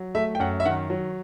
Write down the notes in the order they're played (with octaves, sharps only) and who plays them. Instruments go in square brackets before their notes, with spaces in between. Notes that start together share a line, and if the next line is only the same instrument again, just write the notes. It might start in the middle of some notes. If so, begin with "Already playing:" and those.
Already playing: [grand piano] F#3
A3 E5
G5
F#2 F#5
E5
D#3 F#5
F#3